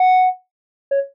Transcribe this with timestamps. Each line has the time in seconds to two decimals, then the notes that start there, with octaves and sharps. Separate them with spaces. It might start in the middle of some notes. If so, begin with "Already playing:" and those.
Already playing: F#5
0.91 C#5